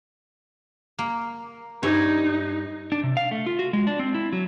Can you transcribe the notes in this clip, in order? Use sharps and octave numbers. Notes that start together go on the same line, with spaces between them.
A#3
G2 D#4 E4 C#5
D4
C3
F5
A3
F4
F#4
G#3
D4
C4
E4
F#3